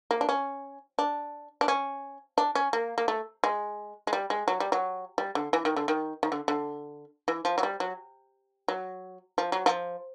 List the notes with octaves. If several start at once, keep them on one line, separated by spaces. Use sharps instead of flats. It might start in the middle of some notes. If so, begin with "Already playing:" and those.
A#3
D4
C#4
D4
D4
C#4
D4
C#4
A#3
A#3
A3
G#3
G#3
G3
G#3
F#3
G3
F#3
G3
D3
E3
D#3
D3
D#3
D#3
D3
D3
E3
F3
F#3
G3
F#3
F#3
F3
F#3
F3